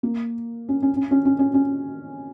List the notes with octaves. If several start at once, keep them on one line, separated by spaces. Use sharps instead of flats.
A#3
C#4
C#4
C#4
C#4
C#4
C#4
C#4